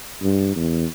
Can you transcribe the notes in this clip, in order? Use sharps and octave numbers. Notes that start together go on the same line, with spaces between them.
G2
E2